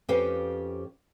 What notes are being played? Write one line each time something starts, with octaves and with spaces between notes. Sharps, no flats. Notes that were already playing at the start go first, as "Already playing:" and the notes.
F2 C#4 G4 B4 C5 F5